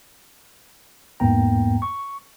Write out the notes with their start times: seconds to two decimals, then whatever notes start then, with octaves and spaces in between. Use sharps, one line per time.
1.20 E2 G#2 A#3 B3 G5 A#5
1.82 C#6